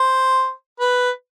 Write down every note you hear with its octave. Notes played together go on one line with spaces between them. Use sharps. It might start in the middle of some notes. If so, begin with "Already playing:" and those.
Already playing: C5
B4